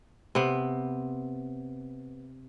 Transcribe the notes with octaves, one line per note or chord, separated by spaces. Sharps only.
C3 B3